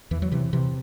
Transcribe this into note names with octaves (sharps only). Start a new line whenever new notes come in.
E2 E3
F#3
C3 E3
C3 E3